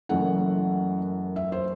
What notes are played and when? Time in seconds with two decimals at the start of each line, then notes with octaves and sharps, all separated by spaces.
0.09 F#1 F#2 E3 A3 F#5
1.36 E5
1.52 C5